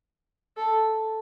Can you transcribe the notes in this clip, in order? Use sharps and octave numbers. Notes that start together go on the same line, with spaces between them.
A4